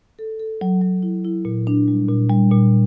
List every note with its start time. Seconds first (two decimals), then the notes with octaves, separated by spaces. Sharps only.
0.19 A4
0.40 A4
0.61 F#3
0.81 F#3
1.03 E4
1.25 E4
1.45 A#2
1.67 D4
1.88 G3
2.09 A#2
2.30 G3
2.51 A#2